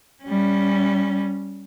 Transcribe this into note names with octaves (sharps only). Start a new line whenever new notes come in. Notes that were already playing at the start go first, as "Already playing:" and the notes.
G3 C#4